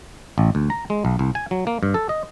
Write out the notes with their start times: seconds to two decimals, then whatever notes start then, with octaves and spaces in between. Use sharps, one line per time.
0.38 A1
0.55 D2
0.70 A#5
0.90 G#3
1.05 B1
1.19 C2
1.35 G#5
1.51 F#3
1.67 A#3
1.83 G2
1.94 A4
2.09 D#5